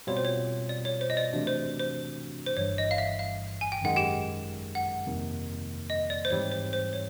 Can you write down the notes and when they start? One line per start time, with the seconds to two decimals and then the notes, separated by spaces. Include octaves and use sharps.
0.07 B2 G3 C4 F4 C#5
0.17 C5
0.25 C#5
0.69 D5
0.85 C#5
1.01 C5
1.10 D#5
1.17 D5
1.33 C3 E3 A3 D4 F#4
1.47 C5
1.80 C5
2.46 C5
2.57 G1 G2 E3 G3 C#5
2.78 D#5
2.91 F5
2.98 E5
3.19 F5
3.61 G#5
3.72 G5
3.81 G#1 F#2 D#3 G#3 F#5
3.96 G4 G5
4.75 F#5
5.06 F2 C3 D#3 G3 A#3
5.90 D#5
6.10 D5
6.25 C5
6.30 G#2 E3 G3 C4 C#5
6.52 C5
6.73 C5
6.93 C#5